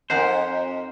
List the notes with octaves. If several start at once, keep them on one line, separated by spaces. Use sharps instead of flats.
F2 D#4 A#4 C5 F#5